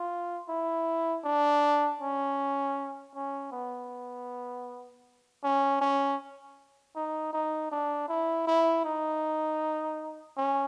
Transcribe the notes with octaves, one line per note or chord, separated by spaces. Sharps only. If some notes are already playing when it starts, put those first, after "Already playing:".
Already playing: F4
E4
D4
C#4
C#4
B3
C#4
C#4
D#4
D#4
D4
E4
E4
D#4
C#4